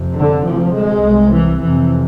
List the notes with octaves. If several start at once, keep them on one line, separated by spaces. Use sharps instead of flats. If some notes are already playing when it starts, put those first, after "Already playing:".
Already playing: F2 C3
D3
D2 C3 F3
G#3
C2 C3
E3
F2 C3 E3